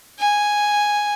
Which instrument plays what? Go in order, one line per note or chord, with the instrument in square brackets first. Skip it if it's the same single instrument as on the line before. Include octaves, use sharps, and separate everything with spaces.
[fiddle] G#5